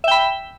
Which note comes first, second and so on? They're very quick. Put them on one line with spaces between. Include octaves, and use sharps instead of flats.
E5 G5 B5